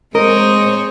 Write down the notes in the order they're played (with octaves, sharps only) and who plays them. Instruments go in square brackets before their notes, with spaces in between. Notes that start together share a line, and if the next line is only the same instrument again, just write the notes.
[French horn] G#3 [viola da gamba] C4 C5 C#5 [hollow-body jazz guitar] A#4 [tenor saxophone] D#5